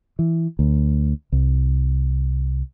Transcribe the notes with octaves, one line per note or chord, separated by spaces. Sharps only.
E3
D2
C2